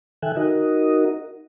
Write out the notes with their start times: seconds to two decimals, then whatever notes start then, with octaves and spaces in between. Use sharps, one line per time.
0.22 D#3 A4 E5 G5 G#5 F#6
0.37 D#4 F#4 A#4 D#5